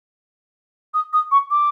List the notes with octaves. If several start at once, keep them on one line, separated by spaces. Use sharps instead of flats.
D#6
D#6
C#6
D6